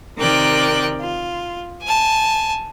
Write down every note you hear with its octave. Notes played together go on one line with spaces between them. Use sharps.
C3 D#3 A#4 D5 G5 F#6
F4
G#5 A5